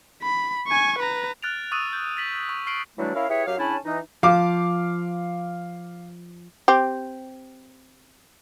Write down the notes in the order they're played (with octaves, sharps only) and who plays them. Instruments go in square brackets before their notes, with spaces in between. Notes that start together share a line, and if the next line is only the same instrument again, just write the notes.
[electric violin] B5
G#5 C#6
B4 A#5
[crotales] F6 F#6 A6 D7 F7
C#6 D#6 E6 F#6 A6 D#7
G6
A6 B6 F#7
C#6
C#6 F6 C7 D7 F#7
[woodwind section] E3 F#3 G3 A3 D4 E4
C#4 E4 A#4 F5
E4 G4 G#4 B4 C#5 E5
F#2 F#3 G4 F5
C#3 C#4 D4 E4 A5 B5
E3 D#4
[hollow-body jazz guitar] F3 [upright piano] F5 D6
[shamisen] C4 G4